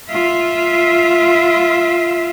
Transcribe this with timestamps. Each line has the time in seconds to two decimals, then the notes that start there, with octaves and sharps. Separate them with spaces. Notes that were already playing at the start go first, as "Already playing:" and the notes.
0.10 F4 E5